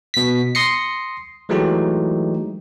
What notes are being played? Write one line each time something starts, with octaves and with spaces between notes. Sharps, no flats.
B2 B6
C6 D#6 A#6 C7 C#7
E3 F#3 G#3 A3 D#4 G4